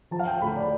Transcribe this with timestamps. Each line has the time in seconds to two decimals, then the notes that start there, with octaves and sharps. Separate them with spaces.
0.11 F3 A5
0.19 F5
0.27 G5
0.42 D2 B5
0.57 D5